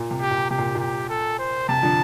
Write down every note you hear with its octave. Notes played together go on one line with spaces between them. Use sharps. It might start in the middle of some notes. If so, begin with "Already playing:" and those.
Already playing: A#2
C3
G4
A#2
C3 G4
A#2
A#2 G4
A4
C5
C3 A5
D3 F3